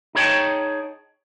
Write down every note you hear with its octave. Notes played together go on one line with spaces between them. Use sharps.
D#4 G#4 C#5 G5 A5